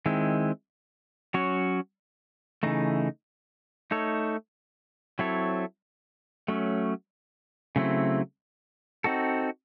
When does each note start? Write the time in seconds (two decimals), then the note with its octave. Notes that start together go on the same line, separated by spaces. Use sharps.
0.06 D#3 G#3 C4 E4
1.34 F#3 C#4 F#4 C#5
2.63 C#3 E3 A3 D#4
3.91 A3 D#4 A4 C#5
5.19 F#3 C4 E4 A4 C#5
6.48 F#3 A3 C#4
7.76 C#3 F#3 A3 C4 E4
9.04 C4 D#4 F#4 A4